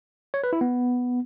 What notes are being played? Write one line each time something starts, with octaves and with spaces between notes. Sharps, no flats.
C#5
B4
E4
B3